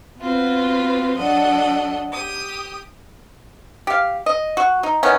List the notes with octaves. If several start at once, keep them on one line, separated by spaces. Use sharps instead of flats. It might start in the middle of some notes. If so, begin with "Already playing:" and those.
B3 C4 F4 F#4 B4
F#3 D4 A4 D#5 F#5
G4 D#6
G4 F5
D#5
F#4
D#4
D#3 E3 B3 C#4